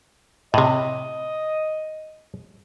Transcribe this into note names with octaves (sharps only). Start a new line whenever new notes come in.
A2 C3 D#5